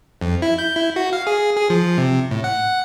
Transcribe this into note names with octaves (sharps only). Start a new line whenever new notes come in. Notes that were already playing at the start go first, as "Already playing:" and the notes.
F2
E4
G6
E4
F#4
F5
G#4
G#4
F3
C3
A2
F#5